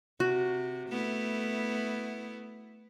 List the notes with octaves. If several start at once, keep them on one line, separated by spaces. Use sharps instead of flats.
C3 F#4
A3 B3 E4